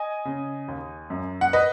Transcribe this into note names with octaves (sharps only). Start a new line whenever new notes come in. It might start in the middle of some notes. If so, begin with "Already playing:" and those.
Already playing: D#5 G#5
C#3
D#2
F#2
F#5
B4 D#5